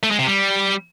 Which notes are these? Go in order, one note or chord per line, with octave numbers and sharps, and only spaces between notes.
A3
G#3
C3
G3